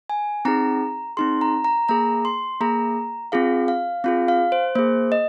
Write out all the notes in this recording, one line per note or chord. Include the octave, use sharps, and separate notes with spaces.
G#5
C4 D#4 G#4 A#5
C4 D#4 G#4 C6
A#5
A#5
A#3 G#4 A#5
C6
A#3 G#4 A#5
C4 F4 G#4 F5
F5
C4 F4 G#4 F5
F5
C5
A#3 G#4 C5
D#5